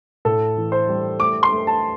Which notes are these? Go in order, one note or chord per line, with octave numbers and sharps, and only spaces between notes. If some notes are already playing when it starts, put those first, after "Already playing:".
A2 A4
E3
C5
G3
A3 D6
C6
A3
A5